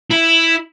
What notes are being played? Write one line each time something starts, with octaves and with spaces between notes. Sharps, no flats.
E4